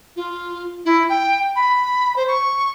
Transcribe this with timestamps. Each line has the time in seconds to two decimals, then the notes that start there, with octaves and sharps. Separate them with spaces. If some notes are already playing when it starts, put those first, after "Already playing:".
0.16 F4
0.85 E4
1.09 G5
1.55 B5
2.16 C5
2.28 C#6